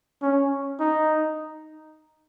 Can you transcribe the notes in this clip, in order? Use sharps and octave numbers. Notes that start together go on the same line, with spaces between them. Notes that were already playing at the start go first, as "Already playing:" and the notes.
C#4
D#4